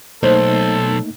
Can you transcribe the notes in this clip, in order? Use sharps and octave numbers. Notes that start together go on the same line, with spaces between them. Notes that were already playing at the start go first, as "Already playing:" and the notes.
B1 A3 A#3 D#4 A4 C5